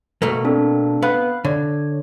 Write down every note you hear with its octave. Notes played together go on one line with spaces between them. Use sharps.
B2 A3 A#3
C4 D4 A4
B3 F5 B5 F#6
D3 C#5